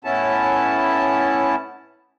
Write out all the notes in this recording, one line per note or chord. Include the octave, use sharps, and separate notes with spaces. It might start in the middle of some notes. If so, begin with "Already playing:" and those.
A2 B3 C#4 E4 A5